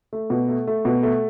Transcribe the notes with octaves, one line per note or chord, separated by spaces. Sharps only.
A3
B2
A3
A3
B2
A3